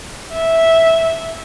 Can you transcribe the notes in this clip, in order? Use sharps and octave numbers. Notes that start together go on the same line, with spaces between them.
E5